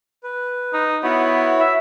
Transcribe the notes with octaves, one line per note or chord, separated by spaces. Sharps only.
B4
D#4
B3 E4 F#4 C#5
E5